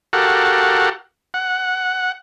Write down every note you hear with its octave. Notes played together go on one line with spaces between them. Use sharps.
F#4 G4 A4 A#4 F5 F#5
F#5